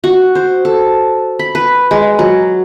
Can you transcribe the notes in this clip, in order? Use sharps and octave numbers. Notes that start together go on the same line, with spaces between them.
F#4
C5
A4
B5
B4
G#3
F#3